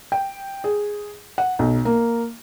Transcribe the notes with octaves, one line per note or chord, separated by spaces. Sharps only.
G5
G#4
F#5
B1
A#3